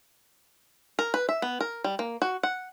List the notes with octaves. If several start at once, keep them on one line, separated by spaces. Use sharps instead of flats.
A#4
B4
E5
B3
A#4
G3
A#3
F#4
F#5